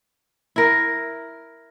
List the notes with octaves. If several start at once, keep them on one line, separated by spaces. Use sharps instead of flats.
E4 A#4